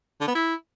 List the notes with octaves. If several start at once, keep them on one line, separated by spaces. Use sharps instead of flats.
D3
B3
E4